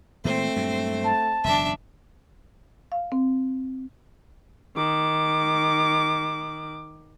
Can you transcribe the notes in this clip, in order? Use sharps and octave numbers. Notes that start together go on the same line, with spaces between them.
A#2 E3 G#3 A3 C4 C5
G2 A#2 F#3
A5
E1 F#2 C#3 D4 E5
F5
C4
D#3 D6